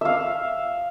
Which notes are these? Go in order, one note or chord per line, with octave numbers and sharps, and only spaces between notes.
E5 F5